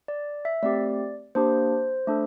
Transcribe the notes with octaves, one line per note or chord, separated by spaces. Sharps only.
D5
E5
A3 C4 G4 D5
A#3 D4 G4 C5
A3 D4 A4